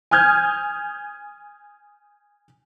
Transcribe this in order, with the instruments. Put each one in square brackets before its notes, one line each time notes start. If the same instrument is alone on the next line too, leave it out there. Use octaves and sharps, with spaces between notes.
[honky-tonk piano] G#5 D#6 F6 G6 G#6